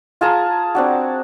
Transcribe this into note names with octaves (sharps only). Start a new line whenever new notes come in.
F4 G#4 A5 A#5
C4 D4 F#4